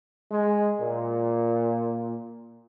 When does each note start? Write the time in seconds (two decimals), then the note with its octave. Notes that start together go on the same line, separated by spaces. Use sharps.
0.32 G#3
0.80 A#2